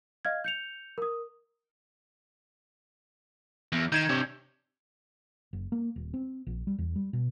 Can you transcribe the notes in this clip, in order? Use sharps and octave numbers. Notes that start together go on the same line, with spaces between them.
D#5 F5 F6 G#6
G6 C#7 F7
A#4 D#6
E2
D#3 G6 G#6 E7
C3 D4 C#5
F#1
A#3
D#1
C4
A#1
G3
E2
G3
B2